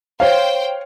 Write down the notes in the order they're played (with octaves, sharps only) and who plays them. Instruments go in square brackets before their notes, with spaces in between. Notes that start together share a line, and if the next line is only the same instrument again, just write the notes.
[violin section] C5 G5 [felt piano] C#5 F5